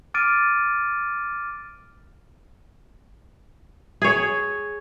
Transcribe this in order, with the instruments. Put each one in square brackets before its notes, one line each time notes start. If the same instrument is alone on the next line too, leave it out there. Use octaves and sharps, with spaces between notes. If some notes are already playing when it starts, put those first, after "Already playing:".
[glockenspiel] D6 F6 A6 D7 D#7
[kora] G#4 C#5